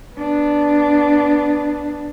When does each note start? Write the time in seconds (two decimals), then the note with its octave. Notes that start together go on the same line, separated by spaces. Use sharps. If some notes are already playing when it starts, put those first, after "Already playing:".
0.16 B3 D4